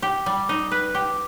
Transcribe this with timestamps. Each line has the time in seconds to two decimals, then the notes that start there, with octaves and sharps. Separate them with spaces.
0.02 G4
0.26 G3
0.49 D#4
0.71 B4
0.95 G4